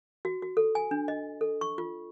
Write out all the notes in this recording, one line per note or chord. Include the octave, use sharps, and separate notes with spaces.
F#4
F#4
A4
G#5
D4
D#5
A4
C#6
F4